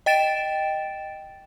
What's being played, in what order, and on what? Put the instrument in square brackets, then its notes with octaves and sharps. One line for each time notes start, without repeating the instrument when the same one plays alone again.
[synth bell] D#5 G5 A6 D7 E7